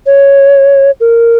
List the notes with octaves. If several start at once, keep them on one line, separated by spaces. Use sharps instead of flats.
C#5
A#4